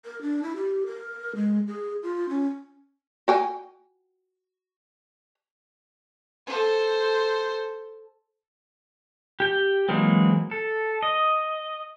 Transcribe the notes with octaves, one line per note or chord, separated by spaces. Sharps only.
A#4
D4
E4
G4
A#4
G#3
G#4
F4
C#4
F#4 G5 G#5
A4 C5
G4 G5
E3 F#3 G#3 A#3 C4
A4
D#5